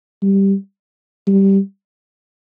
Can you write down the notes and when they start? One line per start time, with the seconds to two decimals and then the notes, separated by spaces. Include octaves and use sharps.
0.22 G3
1.27 G3